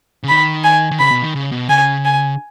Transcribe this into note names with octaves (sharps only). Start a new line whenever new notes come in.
C#3
D#3 B5
G#5
D#3
C#3 B5
B2
D#3
C#3
B2
C#3 G#5
G#5